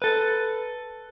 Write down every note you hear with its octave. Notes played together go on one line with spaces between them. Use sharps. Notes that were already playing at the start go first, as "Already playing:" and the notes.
A4 B4